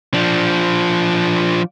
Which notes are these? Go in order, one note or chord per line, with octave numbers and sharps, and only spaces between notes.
F3 D4